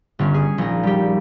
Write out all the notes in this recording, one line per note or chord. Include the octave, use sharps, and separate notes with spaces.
G1 C#4
G#4
A#1 D#4
G3 G4